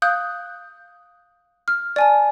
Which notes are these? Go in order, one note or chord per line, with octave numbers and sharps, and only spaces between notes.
F5 D#6 F#6 G6
F6
D5 G#5 A5